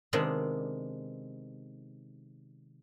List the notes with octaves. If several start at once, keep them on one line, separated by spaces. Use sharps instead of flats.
C3 D#3 G#3 B3 D4